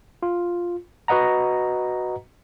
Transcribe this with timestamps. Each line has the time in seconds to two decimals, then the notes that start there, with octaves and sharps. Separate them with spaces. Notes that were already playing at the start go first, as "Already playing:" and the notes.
0.23 F4
1.08 F#4 B4 D#5 F#5 A#5